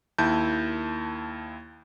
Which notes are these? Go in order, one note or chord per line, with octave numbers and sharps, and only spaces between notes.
D#2 E4 A5 G6